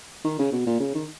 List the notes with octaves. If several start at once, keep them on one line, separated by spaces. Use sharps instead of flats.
D#3
C#3
B2
A#2
C#3
D#3